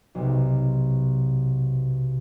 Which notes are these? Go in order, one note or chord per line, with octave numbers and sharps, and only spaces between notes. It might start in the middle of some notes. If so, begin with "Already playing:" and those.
B1 C3